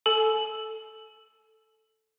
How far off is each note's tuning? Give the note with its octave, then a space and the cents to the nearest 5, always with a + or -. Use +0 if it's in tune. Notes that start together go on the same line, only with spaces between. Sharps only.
A4 +0 G#5 +40